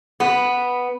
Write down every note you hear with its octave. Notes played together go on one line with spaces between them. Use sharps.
B3 B4